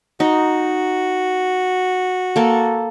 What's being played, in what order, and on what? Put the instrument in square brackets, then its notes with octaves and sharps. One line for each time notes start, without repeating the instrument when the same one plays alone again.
[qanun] D#4 [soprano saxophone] F#4
[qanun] A#3 A4